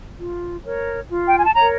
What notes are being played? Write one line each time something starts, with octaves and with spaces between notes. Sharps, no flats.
F4
A#4 C#5
F4
G5
G#5
A5
A#4 C#5 A#5